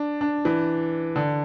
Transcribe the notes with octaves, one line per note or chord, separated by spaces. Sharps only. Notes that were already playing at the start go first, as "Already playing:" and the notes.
Already playing: D4
D4
E3
D3